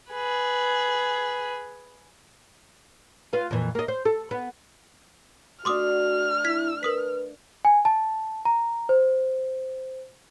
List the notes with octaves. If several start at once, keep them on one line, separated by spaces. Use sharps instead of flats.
G#4 B4
F4 B4 F5
F2 A#2 E3
A#3 D#5
C5
A4
B3
A3 D4 F#4 C6 D6 D#6 F6
E4 G#6 B6
A#4 B4 D#6 B6
G#5
A5
A#5
C5